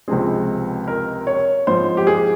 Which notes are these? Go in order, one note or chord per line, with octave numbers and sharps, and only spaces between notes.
C#2 C3 F3 G#3 C4 G#4
A#4
C#5
G#2 F3 C4 C5
G4
G#4